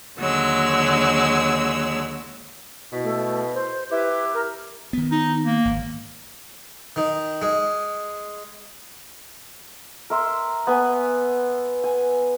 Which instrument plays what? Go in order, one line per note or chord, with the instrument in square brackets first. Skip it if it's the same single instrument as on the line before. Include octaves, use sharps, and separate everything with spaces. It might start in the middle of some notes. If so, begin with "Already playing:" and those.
[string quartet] D#2 D3 F#3 G#3 E6
[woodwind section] B2 E4
[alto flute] A3
C5
[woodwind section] E4 G4 [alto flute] B4
[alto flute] A#4
[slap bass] D#3 B3
[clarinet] D#4
A#3
[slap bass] G#1
[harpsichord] D#3
G#3
[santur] A#4 E5 C6
B3 G#5
G#5